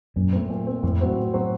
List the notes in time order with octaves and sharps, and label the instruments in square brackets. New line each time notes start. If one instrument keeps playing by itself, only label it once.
[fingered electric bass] F#2 [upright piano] A#2
[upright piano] A3 C4
A#2
A3 C4
[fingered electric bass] F2 [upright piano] A2
[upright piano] F#3 C4 F#4 C5
A2
F#3 C4 F#4 C5